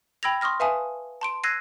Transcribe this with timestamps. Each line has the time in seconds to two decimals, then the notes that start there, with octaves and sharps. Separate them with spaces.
0.23 G5 B5 E6 G#6 A#6 F7
0.41 C6 C#6 D#6 F6 A#6
0.60 B4 E5 F5 G#5 A5 D#6
1.21 A5 C6 D7
1.44 E6 F#6 G#6 A#6 C7 D#7